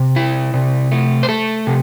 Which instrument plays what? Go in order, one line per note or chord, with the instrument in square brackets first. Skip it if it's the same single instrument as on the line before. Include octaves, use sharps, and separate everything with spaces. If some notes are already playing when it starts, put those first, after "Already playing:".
Already playing: [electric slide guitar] C3
E4
C3
A3
C5
A3 A4
C3